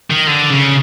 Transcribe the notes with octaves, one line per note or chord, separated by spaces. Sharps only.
D#3
D3
C#3